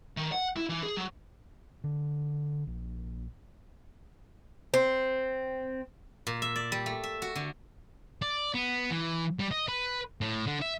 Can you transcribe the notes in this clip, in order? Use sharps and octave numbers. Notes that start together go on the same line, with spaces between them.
D#3
F#5
E4
E3
G#4
F#3
D3
A#1
C4
A#2
E5
D5
G3
A3
E5
F#4
D3
D5
B3
E3
G3
D#5
B4
A2
D3
E5